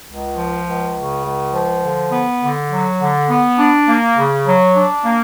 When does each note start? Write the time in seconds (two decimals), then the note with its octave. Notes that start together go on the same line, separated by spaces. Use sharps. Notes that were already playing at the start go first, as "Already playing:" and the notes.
0.08 C#2
0.37 F3
0.67 C#2
0.96 C#3
1.25 C#2
1.54 F3
1.83 D3
2.12 B3
2.42 D3
2.71 F#3
3.01 D3
3.30 B3
3.59 D4
3.88 A#3
4.17 C#3
4.46 F#3
4.76 D4
5.05 A#3